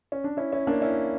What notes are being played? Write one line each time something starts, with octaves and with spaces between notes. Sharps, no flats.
C#4
D4
C#4 E4
C#4 E4
A#3 D4
C#4 E4